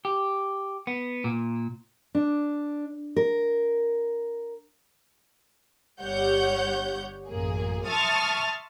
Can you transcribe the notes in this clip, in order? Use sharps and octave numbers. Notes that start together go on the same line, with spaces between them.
G4
B3
A#2
D4
A#4
G1 G3 G4 C#5 F#5 G6
A1 F#2 A#3 G#4
E5 A5 C6 C#6 D#6 F6